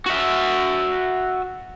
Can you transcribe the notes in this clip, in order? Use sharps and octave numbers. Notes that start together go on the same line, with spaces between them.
F#4 E5